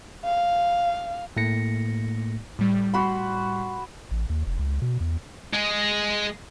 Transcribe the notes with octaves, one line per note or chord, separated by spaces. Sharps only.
F5
A2 A3 A#3 A#6 C#7
A2 G3
F#4 B5 C6
A1
D#2
F1
C#2
B2
E2
G#3 G#4